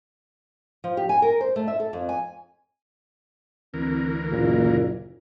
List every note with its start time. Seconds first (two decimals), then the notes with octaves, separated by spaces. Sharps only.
0.84 F3
0.97 G4
1.09 G#5
1.22 A#4
1.41 C5
1.56 A3
1.68 E5
1.80 A4
1.93 F2
2.09 G#5
3.74 D2 E3 C4 A#4
4.31 F#1 A#2